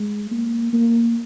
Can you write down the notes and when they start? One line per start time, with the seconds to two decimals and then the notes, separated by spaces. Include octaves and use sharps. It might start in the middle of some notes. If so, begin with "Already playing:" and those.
Already playing: G#3
0.31 A#3
0.73 A#3